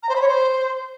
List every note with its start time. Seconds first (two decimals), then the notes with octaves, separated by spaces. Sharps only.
0.02 A#5
0.09 C5
0.15 B5
0.21 C#5
0.28 C5